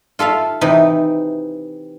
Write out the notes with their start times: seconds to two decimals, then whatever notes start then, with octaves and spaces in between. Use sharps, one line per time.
0.19 F4 A4 E5 F5
0.61 C3 E3 D#4